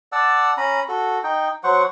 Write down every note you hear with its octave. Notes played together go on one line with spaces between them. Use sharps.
D5 F#5 A5 E6
C#4 A#5 B5
F#4 A4
D#4 G5
F#3 C5 F#5 C#6